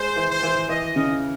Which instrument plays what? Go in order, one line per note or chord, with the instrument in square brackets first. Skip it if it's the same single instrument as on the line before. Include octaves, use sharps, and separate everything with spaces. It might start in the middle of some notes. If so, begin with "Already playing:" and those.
Already playing: [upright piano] G#3 [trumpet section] C5
[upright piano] E3
[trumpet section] C5
[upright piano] E3
[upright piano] E3 [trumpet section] D#5
[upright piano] C#3